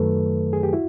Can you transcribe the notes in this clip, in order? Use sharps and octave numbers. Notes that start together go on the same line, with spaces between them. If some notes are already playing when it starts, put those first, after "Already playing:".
Already playing: F#2 D#3 F#3 A3 A4 B4
G#4
G4
E4 F#4